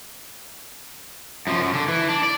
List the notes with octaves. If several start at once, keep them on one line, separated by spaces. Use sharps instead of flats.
F#2 F3
F#2
D3
E3
D4
D5